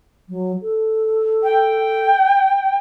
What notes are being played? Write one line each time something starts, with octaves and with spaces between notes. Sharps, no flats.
F#3
A4
G5